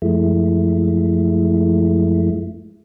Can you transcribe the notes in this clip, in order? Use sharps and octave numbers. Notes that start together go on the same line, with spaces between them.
F#2 F3 G#3 A3 E4